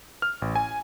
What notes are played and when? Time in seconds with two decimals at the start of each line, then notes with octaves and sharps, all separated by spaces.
0.22 F6
0.42 A1
0.55 G#5